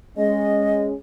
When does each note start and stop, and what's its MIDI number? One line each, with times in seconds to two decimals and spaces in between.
0.17 0.94 56
0.17 0.94 61
0.17 0.84 75